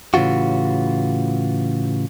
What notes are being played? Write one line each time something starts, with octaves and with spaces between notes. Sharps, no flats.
A2 C#3 E3 F4 F#4